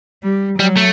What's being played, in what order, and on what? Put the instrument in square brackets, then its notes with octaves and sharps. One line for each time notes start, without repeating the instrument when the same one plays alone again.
[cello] G3
[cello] F#3 [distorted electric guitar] G3
[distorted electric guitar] A3